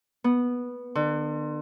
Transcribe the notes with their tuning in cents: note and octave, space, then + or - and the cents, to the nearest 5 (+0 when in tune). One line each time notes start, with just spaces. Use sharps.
B3 -10
D3 +40